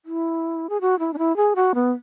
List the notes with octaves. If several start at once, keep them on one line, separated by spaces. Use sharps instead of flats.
E4
G#4
F#4
E4
D4
E4
G#4
F#4
B3